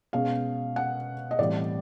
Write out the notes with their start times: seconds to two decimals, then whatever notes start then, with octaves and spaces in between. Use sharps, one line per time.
0.13 B2 G#3 C#4 F5
0.76 F#5
1.31 D#5
1.39 A2 E3 G3 C4 D5